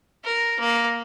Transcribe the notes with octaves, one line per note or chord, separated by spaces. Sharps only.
A#4
A#3